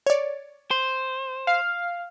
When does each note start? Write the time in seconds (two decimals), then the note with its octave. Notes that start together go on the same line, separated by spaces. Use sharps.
0.07 C#5 D5
0.71 C5
1.47 F5